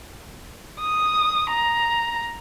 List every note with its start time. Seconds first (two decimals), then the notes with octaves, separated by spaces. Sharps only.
0.80 D#6
1.50 A#5